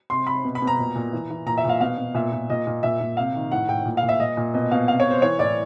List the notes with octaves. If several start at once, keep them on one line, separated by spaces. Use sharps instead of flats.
C3 C6
C3 B5
B2
B5
B2
A#5
A#2
A#2
E3
E3
A#2 A#5
E5
A#2 F5
B2 F5
B2
A#2 E5
A#2
A#2 D#5
A#2
A#2 E5
A#2
C3 F5
D#3
A2 F#5
A2 G5
A#2
F5
A#2
E5
A#2 D#5
A#2
B2 D#5
B2 F5
C3 F5
C#5
C3
C5
E3 C#5
A2 D5